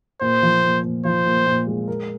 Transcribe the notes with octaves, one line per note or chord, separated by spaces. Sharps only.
A#2 C5
F3
A#2
A#2
F3 C5
A#2
A#2
G#3
A#4